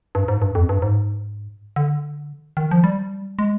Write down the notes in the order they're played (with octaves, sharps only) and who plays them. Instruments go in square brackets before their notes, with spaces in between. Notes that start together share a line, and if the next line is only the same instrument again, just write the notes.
[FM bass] G2
G#2
G2
F2
G2
G#2
D3
D#3
F3
G3
G#3